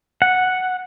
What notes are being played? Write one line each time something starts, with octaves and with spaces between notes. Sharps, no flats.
F#5